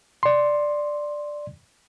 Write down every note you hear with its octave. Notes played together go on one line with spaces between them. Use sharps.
D5 C6